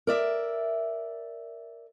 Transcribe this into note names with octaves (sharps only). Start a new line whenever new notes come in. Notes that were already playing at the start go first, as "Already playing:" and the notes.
A#4 D5 E5